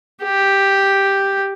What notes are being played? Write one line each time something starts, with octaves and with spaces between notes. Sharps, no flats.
G4